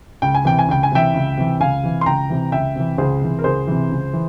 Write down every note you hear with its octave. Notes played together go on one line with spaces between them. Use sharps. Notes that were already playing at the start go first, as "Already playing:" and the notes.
C#2 G5
G#5
C3 E3 G5
G#5
C#2 G5
G#5
C3 E3 E5 G5
C#2
C3 E3
C#2 F5 G#5
C3 E3
C6
C#2 G5 A#5
C3 E3
C#2 E5 G5
C3 E3
C#2 G#4 C5
C3 E3
A#4
C#2 G#4 C5
C3 E3
C#2
E3